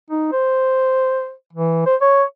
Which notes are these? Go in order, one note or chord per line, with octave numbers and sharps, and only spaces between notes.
D#4
C5
E3
C5
C#5